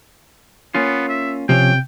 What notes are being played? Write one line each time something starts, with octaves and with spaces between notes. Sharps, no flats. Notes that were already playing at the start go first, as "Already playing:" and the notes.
A#3 B3 C#4 F4
E5
C3 F3 C4 C#4 G5